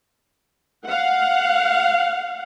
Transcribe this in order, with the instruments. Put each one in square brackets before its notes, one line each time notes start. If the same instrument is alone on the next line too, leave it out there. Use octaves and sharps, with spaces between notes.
[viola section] F5 F#5